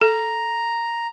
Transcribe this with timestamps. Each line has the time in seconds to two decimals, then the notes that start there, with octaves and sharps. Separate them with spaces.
0.01 A4 A#5